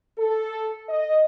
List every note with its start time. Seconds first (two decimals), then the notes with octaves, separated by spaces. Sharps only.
0.18 A4
0.88 D#5